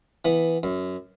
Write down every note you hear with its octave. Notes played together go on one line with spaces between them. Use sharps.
E3 B3
F#2